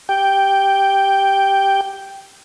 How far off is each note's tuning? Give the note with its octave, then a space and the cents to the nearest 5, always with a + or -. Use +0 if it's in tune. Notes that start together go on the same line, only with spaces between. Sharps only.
G4 +0 G5 +0